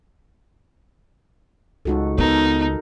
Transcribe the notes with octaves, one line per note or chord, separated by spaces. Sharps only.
C#2 D#4 F#4 A4
B3 D#4 A4 A#4